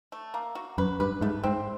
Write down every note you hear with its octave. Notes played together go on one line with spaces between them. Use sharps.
A3
A#3
F#4
F#2 B4
G2 B4
G#2 A3
G#2 C4